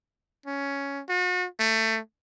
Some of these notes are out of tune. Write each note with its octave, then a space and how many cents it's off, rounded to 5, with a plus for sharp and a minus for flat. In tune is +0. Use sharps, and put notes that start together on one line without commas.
C#4 +10
F#4 -40
A3 +20